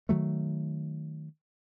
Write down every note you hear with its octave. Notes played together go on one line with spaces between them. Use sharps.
D#3 F#3 A3